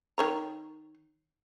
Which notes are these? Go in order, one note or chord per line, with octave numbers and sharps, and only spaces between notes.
D#3 C#5 A#5